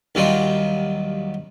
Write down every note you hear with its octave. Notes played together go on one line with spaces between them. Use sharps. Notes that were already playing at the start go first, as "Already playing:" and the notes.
D#2 D#3 F#3 G3 F4